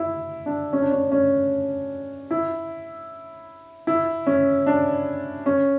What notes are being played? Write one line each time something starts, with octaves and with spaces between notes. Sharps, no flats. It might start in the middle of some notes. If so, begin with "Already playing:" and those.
Already playing: E4
D4
C#4
D4
C#4
C#4
E4
E4
C#4
D4
C#4